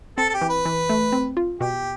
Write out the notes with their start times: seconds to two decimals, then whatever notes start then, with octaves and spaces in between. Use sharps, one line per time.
0.18 C4 A4
0.29 A4
0.34 G4
0.41 E3
0.49 B4
0.65 E3
0.89 A3
1.12 C4
1.37 F4
1.60 B2 G4